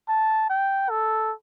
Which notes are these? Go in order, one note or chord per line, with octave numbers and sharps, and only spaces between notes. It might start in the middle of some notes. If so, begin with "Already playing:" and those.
A5
G5
A4